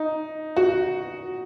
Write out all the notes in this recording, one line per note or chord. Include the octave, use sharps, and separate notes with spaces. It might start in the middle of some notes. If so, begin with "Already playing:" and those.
Already playing: D#4
F#4